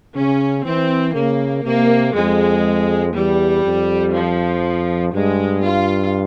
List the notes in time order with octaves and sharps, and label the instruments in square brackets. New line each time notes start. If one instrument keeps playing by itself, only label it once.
[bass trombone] C#3 [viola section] C#4
[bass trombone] E3 [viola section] C4
[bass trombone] C#3 [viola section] A#3
[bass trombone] C3 [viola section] A#3
[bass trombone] F2 [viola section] G#3
[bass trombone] E2 [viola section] G3
[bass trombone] F2
[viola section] F3
[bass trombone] G2 [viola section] G#3
[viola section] F4